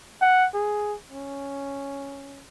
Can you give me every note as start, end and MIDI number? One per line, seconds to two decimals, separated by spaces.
0.22 0.47 78
0.54 0.95 68
1.11 2.46 61